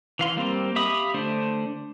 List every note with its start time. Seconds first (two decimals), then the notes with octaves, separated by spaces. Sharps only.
0.19 E3 F5 C6
0.37 G3 A#3 C4
0.76 G4 E5 F5 B5 D#6
1.14 D3 A3 D4 C5